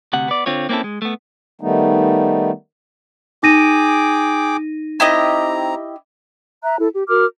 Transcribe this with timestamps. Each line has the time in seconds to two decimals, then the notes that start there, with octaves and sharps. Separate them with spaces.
0.13 D2 C3 F#5
0.28 B3 D5
0.46 D3 C4 F4 C#5
0.69 A#3 C4 C#4 E4 A4
0.84 G#3
1.02 A3 B3
1.61 D#3 G3 A3 B3 D#4
3.43 D#4 G#4 G5 D6 A#6 D#7
5.00 C4 E4 G4 D#5 A#5
6.63 E5 A#5 F#6
6.79 E4 A4
6.93 G4
7.08 F#4 A#4 D6 F6